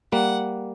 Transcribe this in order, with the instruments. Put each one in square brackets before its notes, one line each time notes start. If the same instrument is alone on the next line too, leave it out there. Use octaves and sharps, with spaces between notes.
[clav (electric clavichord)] G3 A#3 [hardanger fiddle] F#5